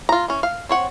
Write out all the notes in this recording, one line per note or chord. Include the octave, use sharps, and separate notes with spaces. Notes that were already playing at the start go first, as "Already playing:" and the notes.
F4 A#5
E3 C#4
F5
C4 C#5 F#5